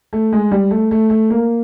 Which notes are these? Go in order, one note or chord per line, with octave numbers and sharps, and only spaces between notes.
A3
G#3
G3
A3
A3
A3
A#3